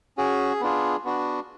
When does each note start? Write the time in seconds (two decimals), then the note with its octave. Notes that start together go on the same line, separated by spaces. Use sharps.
0.18 C#4 F#4 G#4
0.61 B3 D4 F4 G#4
1.05 B3 D4 F#4